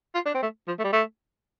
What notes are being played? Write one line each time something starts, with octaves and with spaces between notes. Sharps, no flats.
F4
D4
C4
A3
F3
A3
G3
A3